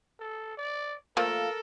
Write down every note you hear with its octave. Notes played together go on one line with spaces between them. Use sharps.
A4
D5
F3 A3 A#3 A4 A#4